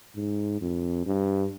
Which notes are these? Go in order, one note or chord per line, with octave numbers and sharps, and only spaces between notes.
G#2
F2
G2